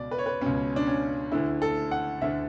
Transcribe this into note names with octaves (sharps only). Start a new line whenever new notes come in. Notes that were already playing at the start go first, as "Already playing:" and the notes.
Already playing: C#2 B2 D5
B4
C#5
B4
C#2 B2 C#4
D4
C#4
D2 D3 E4
A4
F#5
D2 D3 E5